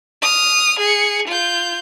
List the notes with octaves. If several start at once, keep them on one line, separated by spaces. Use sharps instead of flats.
D#6 F6
G#4 C#7
F4 G6